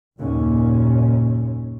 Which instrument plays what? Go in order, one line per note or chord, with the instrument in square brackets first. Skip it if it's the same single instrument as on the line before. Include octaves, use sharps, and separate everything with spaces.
[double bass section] F#1 D#2 A#2 C#4